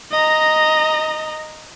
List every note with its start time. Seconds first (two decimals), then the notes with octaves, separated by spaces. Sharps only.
0.11 D#5 A#5